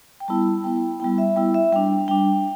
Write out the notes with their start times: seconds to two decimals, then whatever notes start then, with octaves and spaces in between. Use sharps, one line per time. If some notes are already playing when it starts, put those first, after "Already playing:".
0.20 G5
0.28 G3 B3 E4 A5
0.64 G3 B3 E4 G5
1.00 G3 B3 E4 G5
1.18 E5
1.36 G3 B3 E4 G5
1.54 E5
1.72 G3 D4 G5
2.08 G3 D4 G5